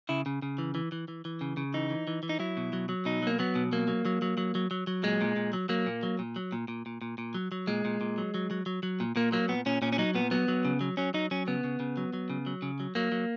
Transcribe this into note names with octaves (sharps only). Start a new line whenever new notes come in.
C#3 E4
C#3
C#3
E3
E3
E3
E3
E3
C#3
C#3
E3 D#4
E3
E3
E3
D#4
F#3 E4
B2
F#3
F#3
B2 D#4
F#3 A#3
F#3 B3
B2
F#3 A#3
F#3
F#3
F#3
F#3
F#3
F#3
F#3
A#2 G#3
A#2
A#2
F#3
F#3 A#3
A#2
F#3
A#2
F#3
A#2
A#2
A#2
A#2
A#2
F#3
F#3
A#2 G#3
A#2
A#2
F#3
F#3
F#3
F#3
F#3
A#2
A#2 A#3
F#3 A#3
A#2 B3
A#2 C#4
A#2 C#4
C#4
F#3 D#4
A#2 B3
F#3 B3
F#3
C#3
F#3
F#3 C#4
F#3 D#4
F#3 C#4
C#3 B3
C#3
C#3
F#3
F#3
C#3
F#3
C#3
F#3
F#3 A#3
F#3